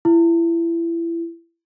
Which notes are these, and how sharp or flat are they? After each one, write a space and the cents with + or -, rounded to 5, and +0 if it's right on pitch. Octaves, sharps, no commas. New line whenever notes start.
E4 +25